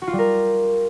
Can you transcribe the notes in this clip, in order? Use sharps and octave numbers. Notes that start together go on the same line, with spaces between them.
F#4
F4
G3
A#4